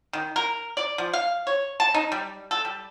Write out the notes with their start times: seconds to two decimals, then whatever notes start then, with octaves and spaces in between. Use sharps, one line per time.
0.13 D#3
0.36 A#4
0.77 D5
0.98 F3
1.13 F5
1.47 C#5
1.80 A5
1.94 D#4
2.12 G3
2.51 A4
2.65 G3